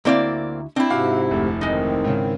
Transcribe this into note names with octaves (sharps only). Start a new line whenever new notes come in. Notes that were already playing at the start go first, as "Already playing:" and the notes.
D2 A#3 C4 E4 D5 F5
C4 D4 E4
G#2 C3 F#4 F5 D6
F1 D2
D#3 G#3 C4 D#4
G#2 C#3